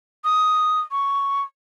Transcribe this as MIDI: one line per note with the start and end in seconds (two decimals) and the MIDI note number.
0.25 0.81 87
0.91 1.42 85